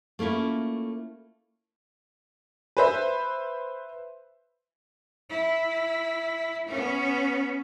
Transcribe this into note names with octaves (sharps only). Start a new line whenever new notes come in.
A3 A#3 C#4 E4 F4
B4 C5 E5
E4
B3 C#4